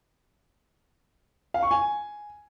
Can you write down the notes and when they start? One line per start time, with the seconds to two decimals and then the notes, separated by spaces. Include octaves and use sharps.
1.54 F5
1.63 C#6
1.71 G#5